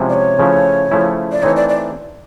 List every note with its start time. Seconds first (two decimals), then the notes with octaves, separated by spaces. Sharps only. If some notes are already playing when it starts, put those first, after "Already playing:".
Already playing: C3 F3 G#3 C#4 E4
0.09 D5
0.13 C#5
0.39 C#3 F3 A3 C#4 E4
0.91 C#3 F3 A3 C#4 E4
1.32 D5
1.43 E3 A3 C4 D#4 C#5
1.56 D5
1.69 D5